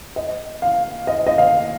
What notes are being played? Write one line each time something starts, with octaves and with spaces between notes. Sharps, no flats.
D#5
F5
D#5
D#5
F5